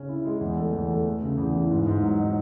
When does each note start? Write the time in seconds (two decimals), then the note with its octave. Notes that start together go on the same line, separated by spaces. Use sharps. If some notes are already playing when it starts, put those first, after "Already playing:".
Already playing: C#3 C#4
0.09 E4
0.25 G#3
0.41 E2
0.57 A3
0.73 E2
0.90 A3
1.06 A3
1.22 C#3
1.38 E2
1.54 E3
1.70 G#2
1.87 G#2
2.03 F#3
2.19 D#4